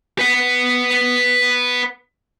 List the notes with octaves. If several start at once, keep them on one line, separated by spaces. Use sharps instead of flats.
B4 F#5